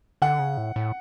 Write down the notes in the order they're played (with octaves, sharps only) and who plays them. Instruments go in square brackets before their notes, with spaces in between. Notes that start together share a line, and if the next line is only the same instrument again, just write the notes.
[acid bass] D3 [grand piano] F#5
[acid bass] C#3
A2
A2